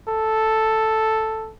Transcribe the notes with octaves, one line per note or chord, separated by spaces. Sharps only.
A4